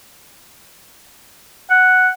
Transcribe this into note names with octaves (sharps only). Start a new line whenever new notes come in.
F#5